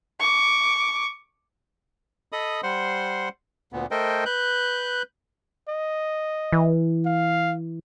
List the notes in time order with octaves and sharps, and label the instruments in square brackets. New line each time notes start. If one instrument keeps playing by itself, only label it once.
[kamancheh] C#6 D6
[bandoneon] A4 D#5 B5 D#6
G3 C5 F#5 C6
D2 A#2 B3
A3 A4 A#4 C5 D#5 G5
B4 F#6 G6
[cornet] D#5
[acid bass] E3
[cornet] F5